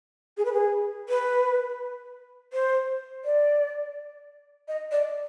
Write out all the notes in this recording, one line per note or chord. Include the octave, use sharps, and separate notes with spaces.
G#4
B4
G#4
B4
C5
D5
D#5
D5